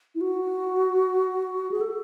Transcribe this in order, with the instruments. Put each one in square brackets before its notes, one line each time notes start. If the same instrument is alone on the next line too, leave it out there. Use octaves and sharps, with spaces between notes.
[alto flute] E4
F#4
G#4
A4